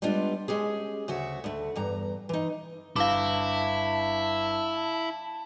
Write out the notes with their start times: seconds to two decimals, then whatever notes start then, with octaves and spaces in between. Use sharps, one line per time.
0.02 G3 G#3 B3 D4 F4
0.48 G#3 C#4 G4 G#4
1.08 D2 C#3 F#4 E5
1.44 D2 A3
1.76 E2 G2 A#5
2.29 E3 D#4
2.96 G1 E4 F5 A5 D6